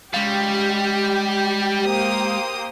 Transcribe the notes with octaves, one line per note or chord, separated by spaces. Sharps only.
G3 G#3 G4 F5
A#3 C5 D#6